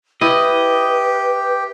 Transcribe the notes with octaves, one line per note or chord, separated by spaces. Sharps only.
E4 G4 B4 D#5